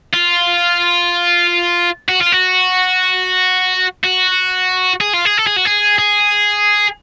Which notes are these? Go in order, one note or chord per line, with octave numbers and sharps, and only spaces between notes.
F4
F#4
F4
F#4
F#4
G#4
F4
G#4
A4
G#4
F#4
G#4
G#4